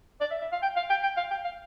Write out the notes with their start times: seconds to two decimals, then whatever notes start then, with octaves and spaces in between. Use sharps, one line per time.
0.21 D5
0.31 E5
0.41 E5
0.52 F5
0.63 G5
0.76 F5
0.90 G5
1.03 G5
1.17 F5
1.31 G5
1.44 F5